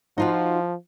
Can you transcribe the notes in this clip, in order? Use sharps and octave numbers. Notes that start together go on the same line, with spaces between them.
F3 D#4 F4 F#4